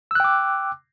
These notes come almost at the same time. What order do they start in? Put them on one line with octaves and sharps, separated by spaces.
E6 F#6 G5 D6